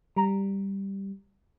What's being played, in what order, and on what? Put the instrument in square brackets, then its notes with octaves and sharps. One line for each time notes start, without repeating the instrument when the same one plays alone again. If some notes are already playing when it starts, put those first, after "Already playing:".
[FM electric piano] G3 [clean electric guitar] A#5